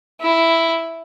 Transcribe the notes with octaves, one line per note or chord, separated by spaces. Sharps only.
E4